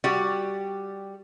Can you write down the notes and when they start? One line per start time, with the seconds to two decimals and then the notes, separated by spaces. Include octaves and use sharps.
0.04 G3 F#4 G4 D5